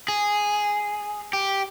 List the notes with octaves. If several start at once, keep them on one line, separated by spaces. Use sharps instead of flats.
G#4
G4